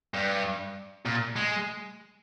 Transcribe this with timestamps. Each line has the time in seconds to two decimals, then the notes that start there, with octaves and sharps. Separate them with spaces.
0.14 G2
1.06 A#2
1.36 G#3